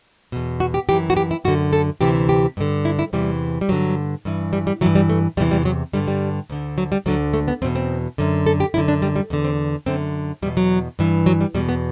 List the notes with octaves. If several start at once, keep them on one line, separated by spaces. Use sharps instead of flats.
E2 B2
F#4
G4
F#2 E3 G4
F#4
G4
E4
F#2 D3 F#4
A4
D2 C3 E3 G4
G4
G2 D3
E4
E4
E2 C3 E3 G3
G3
G2 D3 F#3
G2 E3
G3
G3
G2 E3 F#3
G3
A3
E2 C3 E3 G3
G3
F#3
G2 D3 G3
G3
D2 D3
F#3
G3
D2 D3 F#3
A3
B3
E2 B2 C4
C4
F#2 D3
A4
G4
F#2 D3 E4
D4
G3
G3
E2 D3
C4
F#2 D3 C4
E2 B2 G3
F#3
G2 E3
F#3
G3
E2 B2 G3
B3